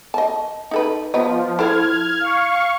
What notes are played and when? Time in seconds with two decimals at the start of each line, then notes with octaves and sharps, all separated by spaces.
0.14 D#5 A5
0.71 D#4 A4 B4
1.14 F3 B3 B4 D#5
1.59 E4 A4 C5 F6 G#6
2.20 F5 C#6